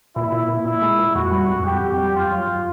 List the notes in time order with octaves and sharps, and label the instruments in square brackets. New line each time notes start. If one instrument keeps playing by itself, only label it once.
[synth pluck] A#2 [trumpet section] E4
[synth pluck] A#2
A#2
[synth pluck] A#2 [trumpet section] E4
[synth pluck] G#3
A#2
[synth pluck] F2 [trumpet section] F#4
[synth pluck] G3
F2
[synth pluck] F2 [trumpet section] G4
[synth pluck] F2
G3
[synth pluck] F#2 [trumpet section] F4
[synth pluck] F#3
F#2